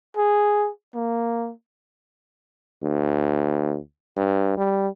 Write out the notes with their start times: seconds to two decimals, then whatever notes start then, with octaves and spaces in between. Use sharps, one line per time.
0.17 G#4
0.95 A#3
2.83 D2
4.16 G2
4.57 G3